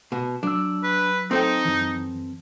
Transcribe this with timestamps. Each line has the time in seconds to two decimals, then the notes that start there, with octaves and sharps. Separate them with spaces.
0.12 B2
0.43 F#3 D4 E6
0.84 B4
1.31 C4 D#4 A4 G5
1.65 F#2 E3